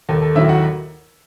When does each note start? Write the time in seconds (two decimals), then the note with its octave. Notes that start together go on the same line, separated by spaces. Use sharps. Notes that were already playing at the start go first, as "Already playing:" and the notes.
0.09 D#2 A4
0.22 A4
0.35 D#3 F#3 E4 E5
0.49 F#4 F#5